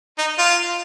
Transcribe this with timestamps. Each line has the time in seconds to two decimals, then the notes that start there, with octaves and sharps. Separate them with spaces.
0.18 D#4
0.39 F4